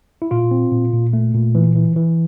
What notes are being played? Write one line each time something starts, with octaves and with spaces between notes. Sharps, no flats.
E4
A#2 F4
C4
A#2
A#2
A3
A#2
E3
E3
E3